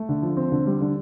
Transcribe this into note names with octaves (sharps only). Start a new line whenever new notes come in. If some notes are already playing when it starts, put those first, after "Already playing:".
Already playing: A3
D3
F3
C4
D3
G3
D3